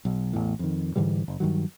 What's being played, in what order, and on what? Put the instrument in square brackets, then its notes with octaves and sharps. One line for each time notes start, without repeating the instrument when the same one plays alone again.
[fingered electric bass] B1
A1 E2 A2
F2 D#3
G#2 D3 E3 G3
F#1
G2 D#3 F#3